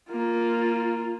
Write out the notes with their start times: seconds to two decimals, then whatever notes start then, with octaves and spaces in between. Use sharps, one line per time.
0.10 A#3 F4